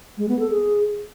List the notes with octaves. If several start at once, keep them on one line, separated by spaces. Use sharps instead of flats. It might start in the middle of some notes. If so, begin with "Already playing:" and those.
G#3
B3
A4
G#4